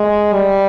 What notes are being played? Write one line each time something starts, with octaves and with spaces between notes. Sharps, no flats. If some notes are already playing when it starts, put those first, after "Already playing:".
Already playing: G#3
G3